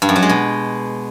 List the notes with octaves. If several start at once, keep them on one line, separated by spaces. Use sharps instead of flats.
G2
F#2
F#3
G#3
B2